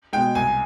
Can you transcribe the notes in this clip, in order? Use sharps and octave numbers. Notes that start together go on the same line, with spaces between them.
B2 G#3 G5
C2 G#5